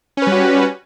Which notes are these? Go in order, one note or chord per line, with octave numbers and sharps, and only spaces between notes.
G3 C#4 F#4 B4